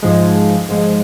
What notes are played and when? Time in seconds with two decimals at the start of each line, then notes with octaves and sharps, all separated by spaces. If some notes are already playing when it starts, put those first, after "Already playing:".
0.02 G#2 F3 G#3
0.69 G#2 F3 G#3